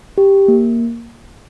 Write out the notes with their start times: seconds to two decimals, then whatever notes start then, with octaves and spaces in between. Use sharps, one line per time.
0.18 G4
0.48 A#3